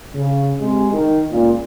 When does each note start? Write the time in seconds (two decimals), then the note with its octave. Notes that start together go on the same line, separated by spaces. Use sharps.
0.15 C#3
0.60 C3 G#3
0.93 D#3
1.31 C#2 A#2